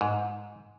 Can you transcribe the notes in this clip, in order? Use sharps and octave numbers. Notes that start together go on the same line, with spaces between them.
G#2